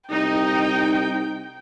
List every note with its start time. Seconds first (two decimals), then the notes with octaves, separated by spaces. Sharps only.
0.10 C2 D#4 G5